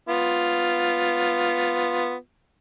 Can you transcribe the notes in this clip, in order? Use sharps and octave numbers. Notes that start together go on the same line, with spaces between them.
B3 F4